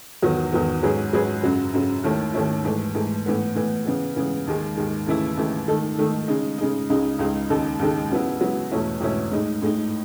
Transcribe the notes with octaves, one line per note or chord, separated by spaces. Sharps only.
E2 D#3 F#3 B3
E2 D#3 F#3 B3
G#2 F#3 C#4 G#4 B4
G#2 F#3 C#4 G#4 B4
F#2 C#3 F#3
F#2 C#3 F#3
D#2 D#3 A3 C#4 E4
D#2 D#3 A3 C#4 E4
G#2 E3 A3
G#2 E3 A3
A2 E3 B3
A2 E3 B3
C#3 E3 B3
C#3 E3 B3
D#2 D#3 G#3
D#2 D#3 G#3
D#2 C#3 E3 A3 E4
D#2 C#3 E3 A3 E4
D#3 A3 D#4 A4
D#3 A3 D#4 A4
C#3 G#3 D#4
C#3 G#3 D#4
C#2 C#3 G#3 D#4
C#2 C#3 G#3 D#4
D#2 C#3 G#3 D#4 A4
D#2 C#3 G#3 D#4 A4
C#3 F#3 B3 E4
C#3 F#3 B3 E4
E2 B2 A3 C#4 E4
E2 B2 A3 C#4 E4
A2 G#3 D#4
A2 G#3 D#4